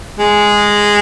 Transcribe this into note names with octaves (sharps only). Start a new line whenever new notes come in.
G#3